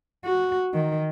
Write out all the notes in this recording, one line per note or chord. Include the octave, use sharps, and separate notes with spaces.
F#4
D#3